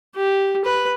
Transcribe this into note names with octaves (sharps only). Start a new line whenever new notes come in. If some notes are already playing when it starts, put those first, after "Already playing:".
G4
B4